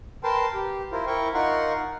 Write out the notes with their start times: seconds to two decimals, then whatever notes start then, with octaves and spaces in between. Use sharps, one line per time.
0.24 A#4 B4 G5 A5 C6
0.54 G4
0.92 E4 F4 A#4 C5
1.07 E4 A#4 G5 C#6
1.34 D#4 F4 A#4 F#5 C6 C#6